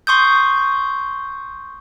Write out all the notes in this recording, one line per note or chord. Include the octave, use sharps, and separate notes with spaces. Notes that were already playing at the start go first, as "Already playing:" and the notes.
C6 C#6 D#6 G6